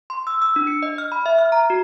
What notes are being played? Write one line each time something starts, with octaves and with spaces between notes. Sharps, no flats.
C6
E6
E6
D4
C#7
D#5
F6
B5
E5
F6
A#5
F#4